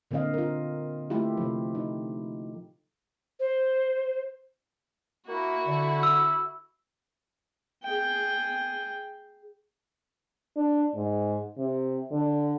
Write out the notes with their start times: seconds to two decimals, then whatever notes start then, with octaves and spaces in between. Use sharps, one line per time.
0.11 A#2 D3 A#3 C4 D#5 F5
0.34 F4 A#4
1.10 A3 E4 F4 G4
1.37 C3 F3
1.75 D#4
3.40 C5
5.27 A#3 E4 F#4
5.66 D3
6.03 E6
7.84 G#4 G5
10.56 D4
10.95 G#2
11.58 C3
12.11 D3